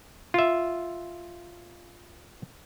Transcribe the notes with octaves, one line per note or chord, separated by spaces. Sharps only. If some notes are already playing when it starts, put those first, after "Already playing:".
F4 E5